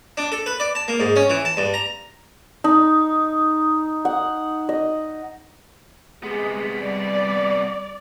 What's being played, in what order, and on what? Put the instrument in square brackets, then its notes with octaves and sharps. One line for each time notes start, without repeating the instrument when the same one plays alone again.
[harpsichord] D4
A4
B4
D5
A5
A#3
G#2
C#4
E3
A5
G2
A#5
[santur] D#4
F#5
D#5
[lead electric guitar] C3 B3 [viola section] G#3
[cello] G3 [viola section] D5